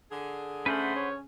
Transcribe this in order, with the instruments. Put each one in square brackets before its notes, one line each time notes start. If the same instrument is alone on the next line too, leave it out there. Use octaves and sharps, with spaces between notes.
[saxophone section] D3 G#4
[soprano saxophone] A3 [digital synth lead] C#4 [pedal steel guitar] B4 C5 F#5
[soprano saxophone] C#5